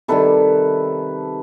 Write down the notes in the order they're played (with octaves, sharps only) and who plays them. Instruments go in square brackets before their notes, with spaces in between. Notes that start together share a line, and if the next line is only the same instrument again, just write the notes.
[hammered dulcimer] C3 D#3 G3 A4 B4